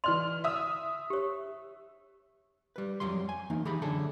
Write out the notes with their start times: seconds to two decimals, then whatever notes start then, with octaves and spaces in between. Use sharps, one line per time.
0.04 E3 D5 D#5 C6 F6 F7
0.44 E5 D#6 E6
1.10 G4 C#5
2.76 G3 B4
3.00 F2 F#3 G3 C6
3.29 G#5
3.50 E3 A#3 D#4
3.65 E3 G4 G#4 B5
3.82 F#2 D3 G#4 A4